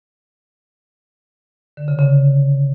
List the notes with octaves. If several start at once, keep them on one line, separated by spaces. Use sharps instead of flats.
D3
C#3
C#3